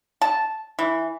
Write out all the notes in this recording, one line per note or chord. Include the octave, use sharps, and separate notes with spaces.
A5
E3